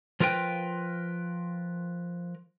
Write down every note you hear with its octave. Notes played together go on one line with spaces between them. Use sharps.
F3 F4 A#4 B4 G5